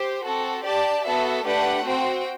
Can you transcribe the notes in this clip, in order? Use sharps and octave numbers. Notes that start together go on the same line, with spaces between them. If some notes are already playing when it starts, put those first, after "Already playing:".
Already playing: G4 C5
C4 F#4 A4
G4 D5 A5
B3 F#4 A4 E5
A3 D4 G4 B4 F#5
C4 F#4 C5 G5